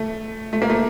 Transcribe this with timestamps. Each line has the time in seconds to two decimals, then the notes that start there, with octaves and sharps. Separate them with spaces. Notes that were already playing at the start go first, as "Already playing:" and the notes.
Already playing: A3
0.53 A3
0.62 A#3
0.70 A3